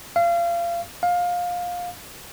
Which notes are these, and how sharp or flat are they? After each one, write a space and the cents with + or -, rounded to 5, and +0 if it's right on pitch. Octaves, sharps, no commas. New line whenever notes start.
F5 -30
F5 +20